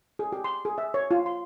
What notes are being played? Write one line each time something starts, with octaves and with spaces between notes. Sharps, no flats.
G#4
G4
C6
G#4
E5
C#5
F4
C6